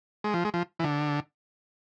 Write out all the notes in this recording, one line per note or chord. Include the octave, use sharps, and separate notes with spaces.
G#3
F3
G#3
F3
E3
D3